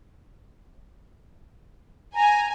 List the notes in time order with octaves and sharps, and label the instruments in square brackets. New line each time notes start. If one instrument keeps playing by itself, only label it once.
[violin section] G#5 [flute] A#5